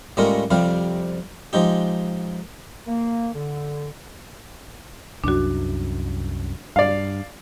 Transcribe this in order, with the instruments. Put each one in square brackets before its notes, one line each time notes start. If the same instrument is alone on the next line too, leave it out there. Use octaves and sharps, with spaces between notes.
[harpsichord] A2 G3 G#3 A#3 C#4 F4
F2 C3 G3 F5
F3 G#3 D#4 G4
[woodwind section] A#3
D3
[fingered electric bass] C2 F#2 [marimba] D4 F#4
[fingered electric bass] G2 [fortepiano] D5 F5